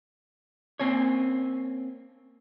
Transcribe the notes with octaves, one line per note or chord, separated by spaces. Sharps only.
A#3 C4 C#4 C#5